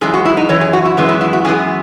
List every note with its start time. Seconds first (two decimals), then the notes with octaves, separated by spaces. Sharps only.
0.01 F#2 E3 G#3 G#4
0.14 F#4
0.25 E4
0.37 D#4
0.49 F#2 E3 C#5
0.61 G#4
0.73 F#4
0.85 E4
0.97 F#2 E3 G#3 B3
1.09 E4
1.21 E4
1.33 F#4
1.44 F#2 E3 G#3 B3 G#4